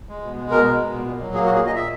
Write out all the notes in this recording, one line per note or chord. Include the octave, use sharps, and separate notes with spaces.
G#3
B2
G#3
B2 A#4
G#3
B2
A#2
A#2
F#3
A#3 G#4
F#4
A#2
G#4
A#2 D#5
E5